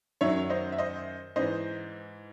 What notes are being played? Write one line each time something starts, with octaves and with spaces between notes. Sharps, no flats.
F#2 D#3 F#3 C#5 E5
C5 D#5
E5
C5 D#5
G#2 E3 C5 D#5